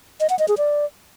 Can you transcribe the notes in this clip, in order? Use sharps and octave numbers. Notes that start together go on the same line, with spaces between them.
D#5
F#5
D#5
G#4
D5